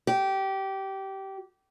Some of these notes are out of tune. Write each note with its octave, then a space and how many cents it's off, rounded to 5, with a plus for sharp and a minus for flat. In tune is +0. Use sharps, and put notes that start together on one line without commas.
G4 -20